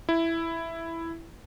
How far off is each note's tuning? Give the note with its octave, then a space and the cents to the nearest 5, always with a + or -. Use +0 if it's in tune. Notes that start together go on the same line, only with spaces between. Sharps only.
E4 +5